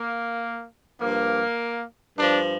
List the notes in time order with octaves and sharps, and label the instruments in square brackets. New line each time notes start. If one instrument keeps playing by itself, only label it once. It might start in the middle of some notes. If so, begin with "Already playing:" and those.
Already playing: [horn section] A#3
G2 F3 A#3
G2 F3 D4